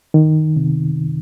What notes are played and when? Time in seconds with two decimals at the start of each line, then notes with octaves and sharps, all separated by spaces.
0.14 D#3
0.56 C3